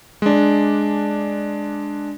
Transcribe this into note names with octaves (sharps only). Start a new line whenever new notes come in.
G#3 D4